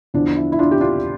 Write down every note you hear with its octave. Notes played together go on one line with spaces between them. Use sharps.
E2 D3 F3 D4
E4
E4
D4 F4
G4
D4 F4